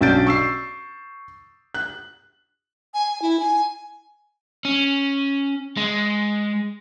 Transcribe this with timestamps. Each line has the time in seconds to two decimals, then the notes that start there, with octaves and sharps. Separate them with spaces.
0.01 B1 C#4 D4 G6 A6 D7
0.27 C#6 E6 C7
1.74 F#6
2.94 G#5
3.22 E4
3.40 G#5
4.65 C#4
5.77 G#3